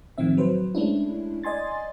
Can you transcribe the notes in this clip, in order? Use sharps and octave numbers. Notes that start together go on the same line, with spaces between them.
A2 D#3 F3 C4 E5
F#3 B4 C5
G#3 A3 C#4 D4 E4
D5 D#5 G#5 C6 A6